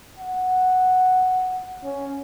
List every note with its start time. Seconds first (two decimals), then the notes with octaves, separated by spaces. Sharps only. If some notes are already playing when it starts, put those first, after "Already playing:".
0.18 F#5
1.84 C#4